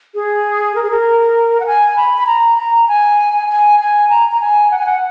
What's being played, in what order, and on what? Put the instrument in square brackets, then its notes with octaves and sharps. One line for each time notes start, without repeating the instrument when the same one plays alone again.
[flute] G#4
A#4
G#4
A#4
F#5
G#5
B5
B5
A#5
A#5
G#5
G#5
G#5
A#5
A#5
G#5
F#5
G#5
F#5